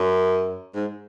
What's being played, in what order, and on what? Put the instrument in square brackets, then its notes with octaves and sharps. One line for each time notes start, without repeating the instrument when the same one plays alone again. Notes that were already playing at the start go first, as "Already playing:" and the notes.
Already playing: [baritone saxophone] F#2
G#2